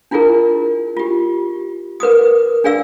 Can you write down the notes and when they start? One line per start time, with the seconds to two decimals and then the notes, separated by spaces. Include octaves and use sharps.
0.11 D4 E4 F4 G#4 A#4
0.97 F4 G4
2.00 A#4 B4 D6 D#6
2.64 D4 G#4 D5 F5 E6